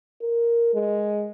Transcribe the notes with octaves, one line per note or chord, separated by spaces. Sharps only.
A#4
G#3